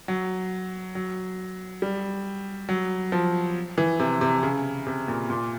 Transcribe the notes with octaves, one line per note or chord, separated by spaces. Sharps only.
F#3
F#3
G3
F#3
F3
E3
C3
C3
C#3
C3
A#2
A#2